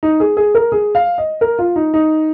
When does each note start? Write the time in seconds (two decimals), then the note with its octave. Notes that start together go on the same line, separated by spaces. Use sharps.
0.03 D#4
0.20 G#4
0.37 G#4
0.55 A#4
0.72 G#4
0.95 F5
1.18 D#5
1.41 A#4
1.59 F4
1.76 D#4
1.94 D#4